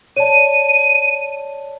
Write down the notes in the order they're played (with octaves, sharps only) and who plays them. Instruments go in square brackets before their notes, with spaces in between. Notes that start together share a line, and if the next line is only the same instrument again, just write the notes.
[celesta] C#5 D5 A5 [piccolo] D#7